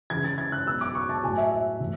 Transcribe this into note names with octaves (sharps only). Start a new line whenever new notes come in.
C#3 E3 G#6
A6
G#6
F#6
B2 F#3 E6
D6
C#6
A5
A2 F#3 G#5
E5
E5
A2 E3